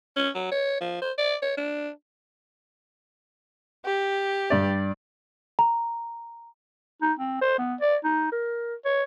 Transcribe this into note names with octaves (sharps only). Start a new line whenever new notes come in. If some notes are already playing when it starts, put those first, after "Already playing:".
C#4
F#3
C#5
F3
C5
D5
C#5
D4
G4
G2 D5
A#5
D#4
C4
C5
B3
D5
D#4
A#4
C#5